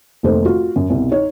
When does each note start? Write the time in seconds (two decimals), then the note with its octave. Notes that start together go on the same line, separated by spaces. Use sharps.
0.23 F1 D#2 A4 C5
0.45 F4 F#4
0.76 F#2
0.90 C2 B2
1.12 D#4 C#5